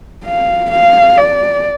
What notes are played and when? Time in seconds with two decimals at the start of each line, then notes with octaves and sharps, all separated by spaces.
0.25 F5
0.71 F5
1.17 D5